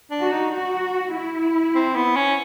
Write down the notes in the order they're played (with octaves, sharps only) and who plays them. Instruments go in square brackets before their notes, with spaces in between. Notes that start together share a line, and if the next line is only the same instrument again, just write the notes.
[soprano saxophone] D4
[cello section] F#4
[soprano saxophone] D#4
[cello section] F#4
E4
[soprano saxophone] C4
B3
C#4